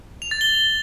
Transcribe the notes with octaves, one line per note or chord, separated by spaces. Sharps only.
F7
A6
G7